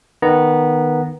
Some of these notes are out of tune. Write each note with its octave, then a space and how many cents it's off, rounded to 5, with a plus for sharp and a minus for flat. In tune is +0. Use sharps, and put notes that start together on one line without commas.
D#3 -10 B3 -10 A#5 +0